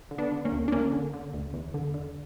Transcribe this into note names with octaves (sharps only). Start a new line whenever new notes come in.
D3
B3 D4
D3
A#3 C#4
D2
D4
D2 A#3 C#4
D3
D3
D2
E2
D3
D3